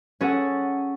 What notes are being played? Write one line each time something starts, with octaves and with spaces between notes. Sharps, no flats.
C#4 G#4 A4 F#5